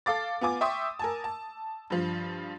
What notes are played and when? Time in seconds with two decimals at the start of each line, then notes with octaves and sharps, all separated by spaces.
0.06 A4 F5 D6 A6
0.41 B3 F4 G#5 D6
0.61 E5 G5 C6 C#6 D#6 E6
0.99 A#4 G#5 A5
1.24 A5
1.90 G2 F3